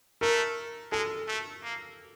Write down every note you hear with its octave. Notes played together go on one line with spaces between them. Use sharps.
A3 A#4
G#3 A4
A3
A#3